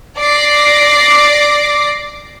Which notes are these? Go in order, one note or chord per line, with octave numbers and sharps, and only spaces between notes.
D5 D6 A#6 C7